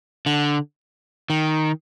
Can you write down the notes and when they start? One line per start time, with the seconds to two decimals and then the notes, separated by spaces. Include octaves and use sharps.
0.26 D3
1.30 D#3